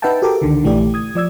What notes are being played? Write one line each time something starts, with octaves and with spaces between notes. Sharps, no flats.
D#4 B4 E5 F#5 G5 A5
F#4 G4 A4 A#4 D6
C#2 D3 D#3
A#1 E3 A3 G4 D5
D#6 G#6
F3 D5 E6 G#6